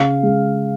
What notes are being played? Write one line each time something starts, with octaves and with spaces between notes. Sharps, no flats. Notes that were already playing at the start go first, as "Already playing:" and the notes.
Already playing: C#3 F5
G#3